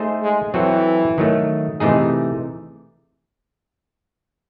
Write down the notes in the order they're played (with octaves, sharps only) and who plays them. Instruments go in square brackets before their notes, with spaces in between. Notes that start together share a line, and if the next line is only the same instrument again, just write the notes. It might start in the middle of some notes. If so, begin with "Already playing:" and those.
Already playing: [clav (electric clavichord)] A3 D#4 G#4 C5
[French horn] G#3
[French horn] E3 [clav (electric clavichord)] F#3 C4 F#4 A4
[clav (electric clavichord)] D#3 F#3 A3
C3 E3 A3 D#4 G#4